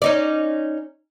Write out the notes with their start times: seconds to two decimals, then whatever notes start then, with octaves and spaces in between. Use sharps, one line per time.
0.02 C#4 D#4 D5